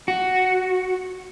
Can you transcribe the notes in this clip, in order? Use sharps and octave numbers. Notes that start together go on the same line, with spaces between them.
F#4